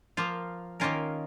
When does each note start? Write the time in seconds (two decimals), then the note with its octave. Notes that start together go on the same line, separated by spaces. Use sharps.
0.17 F3 A#3 F4
0.80 D#3 A#3 C#4 F4 A#4